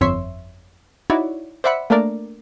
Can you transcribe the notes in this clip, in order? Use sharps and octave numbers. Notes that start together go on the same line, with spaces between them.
G1 F2 C#5 E5 C6
D#4 E4 F#4 C#5 D5
C5 D5 E5 F#5 B5 C#7
A3 A#3 D4 A#4 D5